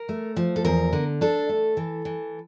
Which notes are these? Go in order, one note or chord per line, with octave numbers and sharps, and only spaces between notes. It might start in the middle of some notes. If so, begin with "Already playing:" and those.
Already playing: A#4
A3
F3
A4
E2 A#4
D3
D4 A4
A3
E3
E3